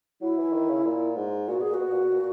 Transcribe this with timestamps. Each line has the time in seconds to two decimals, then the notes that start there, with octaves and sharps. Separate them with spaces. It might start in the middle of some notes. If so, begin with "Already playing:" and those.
0.21 F#3 E4
0.38 E3
0.53 D#3
0.69 C#3
0.85 A#2
1.16 G#2
1.47 A#2 F#4
1.59 B2 G#4
1.70 A#2 F#4
1.80 B2
1.91 A#2
2.03 B2
2.13 A#2